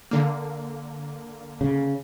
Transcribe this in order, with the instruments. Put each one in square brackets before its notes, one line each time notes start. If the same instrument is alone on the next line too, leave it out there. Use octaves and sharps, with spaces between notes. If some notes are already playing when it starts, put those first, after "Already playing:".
[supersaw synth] D3 A#3
[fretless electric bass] C#3